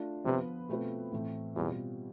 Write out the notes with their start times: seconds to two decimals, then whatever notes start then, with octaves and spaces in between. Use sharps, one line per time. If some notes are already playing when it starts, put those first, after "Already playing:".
Already playing: A3 D4 F4
0.25 C3 F3 B3 F4 B4
0.68 B2 A3 C4 F4 B4
1.12 A2 E3 A3 C4
1.56 E2 B2 G3 C4 F4